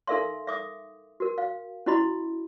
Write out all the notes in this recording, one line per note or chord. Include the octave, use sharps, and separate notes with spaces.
D#4 A4 A#4 E5 F5 C6
E5 D6 D#6
F#4 A#4
F5
C#4 E4 F#4 D#5 B5 C6